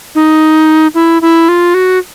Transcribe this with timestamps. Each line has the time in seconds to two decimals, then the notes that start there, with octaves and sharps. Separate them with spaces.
0.15 D#4
0.95 E4
1.22 E4
1.49 F4
1.74 F#4